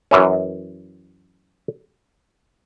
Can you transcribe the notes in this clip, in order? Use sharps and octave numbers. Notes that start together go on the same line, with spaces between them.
F#2 E3 C#4